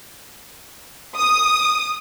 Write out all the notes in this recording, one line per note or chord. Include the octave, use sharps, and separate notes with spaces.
D#6